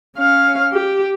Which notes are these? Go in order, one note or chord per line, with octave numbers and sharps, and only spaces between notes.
C#4 F5
G4